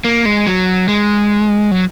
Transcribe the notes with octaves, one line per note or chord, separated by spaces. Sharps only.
A#3
G#3
F#3
G#3
F#3